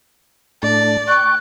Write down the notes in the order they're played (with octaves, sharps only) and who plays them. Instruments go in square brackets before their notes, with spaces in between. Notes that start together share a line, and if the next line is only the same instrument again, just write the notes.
[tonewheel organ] A2 A3 D4 [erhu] D5
[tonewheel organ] G5 D6 [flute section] C#6 [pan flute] F#6